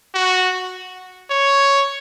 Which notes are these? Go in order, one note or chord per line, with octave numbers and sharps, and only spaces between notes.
F#4
C#5